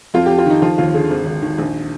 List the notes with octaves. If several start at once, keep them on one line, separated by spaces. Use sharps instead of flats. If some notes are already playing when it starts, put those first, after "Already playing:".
F2 F4
F2 G4
F4
D#3 D#4
F3 F4
D#2 F4
D3 G#4
G#1
G#1
D#3
A#1